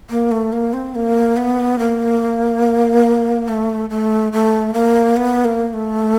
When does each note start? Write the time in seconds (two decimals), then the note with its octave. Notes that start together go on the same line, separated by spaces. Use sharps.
0.10 A#3
0.31 A3
0.53 A#3
0.73 C4
0.95 A#3
1.37 B3
1.79 A#3
3.48 A3
3.90 A3
4.33 A3
4.74 A#3
5.17 B3
5.45 A#3
5.73 A3